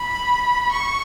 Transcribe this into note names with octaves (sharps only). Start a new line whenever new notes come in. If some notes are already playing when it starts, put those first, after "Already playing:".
Already playing: B5
C#6